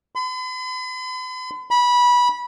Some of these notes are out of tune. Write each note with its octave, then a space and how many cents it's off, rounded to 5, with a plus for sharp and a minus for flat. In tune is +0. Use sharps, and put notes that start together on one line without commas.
B5 +45
B5 -20